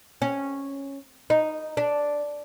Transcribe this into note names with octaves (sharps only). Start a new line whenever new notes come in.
C#4
D#4
D4